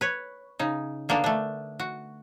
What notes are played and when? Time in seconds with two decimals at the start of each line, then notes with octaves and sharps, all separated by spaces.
0.01 B4 C#5
0.59 C#3 D#4
1.09 D3 A#3 B3 D4
1.24 A3 D4
1.79 F#4